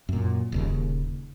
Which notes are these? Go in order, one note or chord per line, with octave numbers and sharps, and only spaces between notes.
F#2 A#2
D#1 D#2 C#3